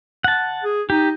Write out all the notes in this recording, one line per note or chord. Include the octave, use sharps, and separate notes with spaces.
F#5 A5
G#4
D#4 G4